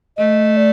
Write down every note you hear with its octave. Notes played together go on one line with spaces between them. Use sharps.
A3 D#5
D5